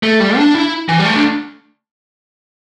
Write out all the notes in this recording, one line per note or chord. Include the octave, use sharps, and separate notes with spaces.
A3
G3
D4
E4
E3
G3
A3
D4